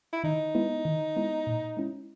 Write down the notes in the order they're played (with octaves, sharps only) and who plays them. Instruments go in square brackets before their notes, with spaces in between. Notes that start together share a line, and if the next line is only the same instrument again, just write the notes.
[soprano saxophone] E4
[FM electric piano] D#3 [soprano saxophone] D#4
[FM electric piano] G#3 B3 E4
D#3
G#3 B3 E4
A#2
G#3 C#4 E4